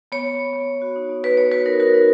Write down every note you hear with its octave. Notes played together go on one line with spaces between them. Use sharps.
B3 C#5
B3
B3
B3
B3
F#4
D#4
B3
F#4 B4
B3 C#5
F#4 B4
D#4 A#4
F#4 A#4
D#4